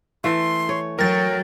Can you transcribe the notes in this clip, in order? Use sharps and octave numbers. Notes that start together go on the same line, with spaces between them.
E3 A3 C6
C#5
F#3 A#4 G5 A6